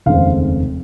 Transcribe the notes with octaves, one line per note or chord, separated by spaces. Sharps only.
F1 D#2 C#3 G#3 C4 F5